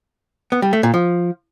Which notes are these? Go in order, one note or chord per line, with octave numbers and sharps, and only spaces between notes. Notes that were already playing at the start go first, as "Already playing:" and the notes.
B3
G3
A3
A#2
F3